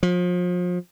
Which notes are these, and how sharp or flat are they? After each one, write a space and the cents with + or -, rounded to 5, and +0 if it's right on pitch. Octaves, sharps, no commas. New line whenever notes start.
F3 +35